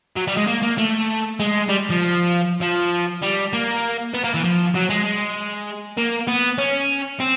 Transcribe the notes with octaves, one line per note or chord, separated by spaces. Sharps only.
F#3
G3
G#3
A#3
A#3
A3
G#3
G3
F3
F3
G3
A#3
B3
A#3
E3
F3
F#3
G#3
G#3
A#3
B3
C#4
C4